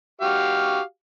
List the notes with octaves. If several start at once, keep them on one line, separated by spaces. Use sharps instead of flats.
F#4 G4 F5